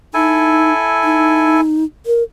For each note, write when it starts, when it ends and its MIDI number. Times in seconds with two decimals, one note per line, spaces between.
0.14 0.72 63
0.14 1.61 64
0.14 1.61 69
0.14 1.61 80
1.04 1.84 63
2.06 2.23 70